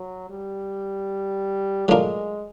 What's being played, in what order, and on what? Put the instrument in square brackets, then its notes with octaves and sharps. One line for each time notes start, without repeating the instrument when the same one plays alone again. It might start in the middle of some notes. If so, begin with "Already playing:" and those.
Already playing: [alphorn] F#3
G3
[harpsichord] F#3 A3 D4 F4 A#4 [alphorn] G#3